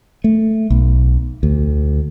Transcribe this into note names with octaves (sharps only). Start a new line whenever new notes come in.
A3
B1
D2